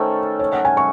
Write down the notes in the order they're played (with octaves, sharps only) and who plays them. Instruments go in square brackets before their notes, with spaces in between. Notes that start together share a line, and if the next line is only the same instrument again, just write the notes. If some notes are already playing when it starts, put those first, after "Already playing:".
Already playing: [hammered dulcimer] D#3 A3 C#4 [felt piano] C5
[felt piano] C#5
F#5
G#5
C#6